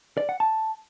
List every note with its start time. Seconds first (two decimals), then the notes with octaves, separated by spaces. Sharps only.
0.17 D5
0.29 F#5
0.40 A5